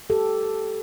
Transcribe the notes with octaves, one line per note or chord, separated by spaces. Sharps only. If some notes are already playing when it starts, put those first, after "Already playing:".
G4 A4